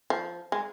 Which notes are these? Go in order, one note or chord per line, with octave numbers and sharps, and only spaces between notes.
F3
G#3